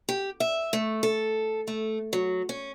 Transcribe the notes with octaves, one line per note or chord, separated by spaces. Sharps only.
G4
E5
A3
A4
A3
F#3
C#4